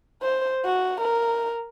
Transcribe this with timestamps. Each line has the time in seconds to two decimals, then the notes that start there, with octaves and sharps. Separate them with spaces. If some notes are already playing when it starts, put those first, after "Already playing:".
0.22 C5
0.65 F#4
1.01 A#4